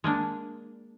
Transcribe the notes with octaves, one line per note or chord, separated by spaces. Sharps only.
G#3 A#3 D4